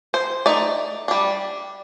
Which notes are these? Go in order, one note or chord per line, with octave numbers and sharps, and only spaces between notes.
C5
A3 D#4 D5
G3 D4